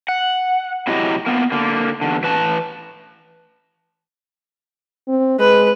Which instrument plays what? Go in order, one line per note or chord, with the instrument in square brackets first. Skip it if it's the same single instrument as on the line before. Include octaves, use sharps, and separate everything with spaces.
[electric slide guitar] F#5
C3 F#3 E4 G4 D#5
A#3 B3 F4
D3 A#3
E2 G#2 D3
E3 B4 A5
[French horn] C4
[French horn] G#3 [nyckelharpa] B4